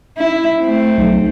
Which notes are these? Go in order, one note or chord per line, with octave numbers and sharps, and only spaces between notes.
E4
A3 C4
B1